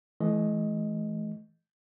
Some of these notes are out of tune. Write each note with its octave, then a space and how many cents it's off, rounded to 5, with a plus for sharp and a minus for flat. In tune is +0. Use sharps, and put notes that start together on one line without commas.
E3 +0 A3 -45 D#5 +0